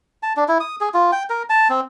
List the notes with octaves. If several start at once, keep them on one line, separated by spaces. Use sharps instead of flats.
A5
D4
E4
D#6
G#4
F4
G5
A#4
A5
C4